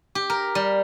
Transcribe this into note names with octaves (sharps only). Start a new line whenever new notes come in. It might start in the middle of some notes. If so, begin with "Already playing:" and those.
G4
A#4
G3